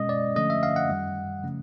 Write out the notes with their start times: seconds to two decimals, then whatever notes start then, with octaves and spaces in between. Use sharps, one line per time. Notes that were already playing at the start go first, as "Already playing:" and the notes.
Already playing: B2 G#3 C#4 D#5
0.09 D5
0.36 D3 F3 A3 C#4 D#5
0.50 E5
0.63 F5
0.76 F#5
0.90 F#2 D#3 G3
1.43 C#3 F3 A3 C#4